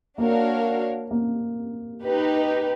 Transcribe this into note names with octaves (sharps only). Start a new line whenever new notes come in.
A#3 D4 F#4 A#4 C#5 F5
A#3
D#4 G4 B4